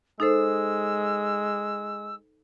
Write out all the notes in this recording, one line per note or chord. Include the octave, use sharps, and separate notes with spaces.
G#3 D#4 A4 C5 E6